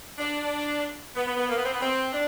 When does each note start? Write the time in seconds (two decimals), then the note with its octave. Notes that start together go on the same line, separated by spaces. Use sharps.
0.18 D4
1.16 B3
1.27 B3
1.37 B3
1.48 A#3
1.56 B3
1.65 C4
1.73 B3
1.80 C4
2.13 D4